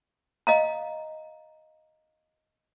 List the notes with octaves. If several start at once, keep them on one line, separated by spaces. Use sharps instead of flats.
D#5 F5 A#5